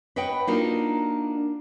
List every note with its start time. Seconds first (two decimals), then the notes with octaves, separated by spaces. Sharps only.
0.16 B4 C#5 D#5 F#5 G5
0.47 A#3 D4 D#4 F4 F#4